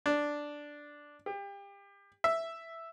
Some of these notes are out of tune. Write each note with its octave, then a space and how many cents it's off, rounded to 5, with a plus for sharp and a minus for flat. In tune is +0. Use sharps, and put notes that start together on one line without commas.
D4 +0
G4 +30
E5 +0